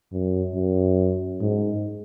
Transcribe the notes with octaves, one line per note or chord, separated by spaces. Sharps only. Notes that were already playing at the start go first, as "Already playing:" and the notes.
F#2
F#2
G#2